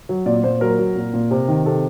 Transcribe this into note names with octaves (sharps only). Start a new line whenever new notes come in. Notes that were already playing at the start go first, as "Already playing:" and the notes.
F#3
A#2 D5
A#2 C5
F#3 A#4
F#3
A#2
A#2
C3
D#3
C3 A4